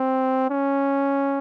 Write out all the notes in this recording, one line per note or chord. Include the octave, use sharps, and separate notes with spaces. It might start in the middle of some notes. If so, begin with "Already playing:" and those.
Already playing: C4
C#4